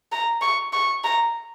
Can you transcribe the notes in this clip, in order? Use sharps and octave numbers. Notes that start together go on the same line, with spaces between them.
A#5
C#6
C#6
A#5